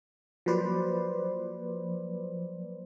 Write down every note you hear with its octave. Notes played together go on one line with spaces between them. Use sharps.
F3 F#3 A#3 B4 C5 D5